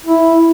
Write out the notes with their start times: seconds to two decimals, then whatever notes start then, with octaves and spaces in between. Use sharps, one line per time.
0.06 E4